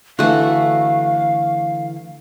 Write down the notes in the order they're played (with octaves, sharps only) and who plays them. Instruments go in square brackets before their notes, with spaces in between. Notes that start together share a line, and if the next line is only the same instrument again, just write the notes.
[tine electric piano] D3 E3 [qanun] A3 F#4 [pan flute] F5